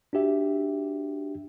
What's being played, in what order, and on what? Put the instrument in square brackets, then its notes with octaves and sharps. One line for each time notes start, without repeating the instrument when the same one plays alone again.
[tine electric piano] D4 F#4 G4 E5